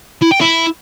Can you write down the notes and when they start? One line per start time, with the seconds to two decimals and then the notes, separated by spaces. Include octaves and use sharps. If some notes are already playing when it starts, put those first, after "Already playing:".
0.22 E4
0.31 G5
0.41 E4